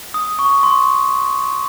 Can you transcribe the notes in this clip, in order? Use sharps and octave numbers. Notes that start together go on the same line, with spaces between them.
D#6
C#6
C6